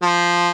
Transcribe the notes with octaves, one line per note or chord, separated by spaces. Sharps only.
F3